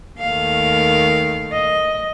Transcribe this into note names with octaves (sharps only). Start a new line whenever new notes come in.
D#2 D#3 A3 F5
D#5